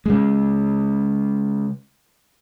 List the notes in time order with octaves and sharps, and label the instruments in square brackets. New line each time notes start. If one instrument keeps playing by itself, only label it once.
[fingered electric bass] C#3 G#3